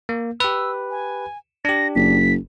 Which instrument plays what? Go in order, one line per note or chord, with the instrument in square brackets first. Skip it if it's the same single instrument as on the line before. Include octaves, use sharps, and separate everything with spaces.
[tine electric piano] A#3
[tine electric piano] G4 B4 [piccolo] E6
[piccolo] G#5
[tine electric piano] D4 G4 [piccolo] A#6
[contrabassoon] F#1 [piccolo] B6